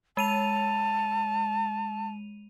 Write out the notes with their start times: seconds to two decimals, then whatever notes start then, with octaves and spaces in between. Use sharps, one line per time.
0.17 G#3 A5 D#7 F7